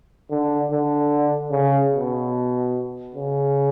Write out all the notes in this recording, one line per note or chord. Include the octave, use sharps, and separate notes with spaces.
D3
D3
C#3
B2
C#3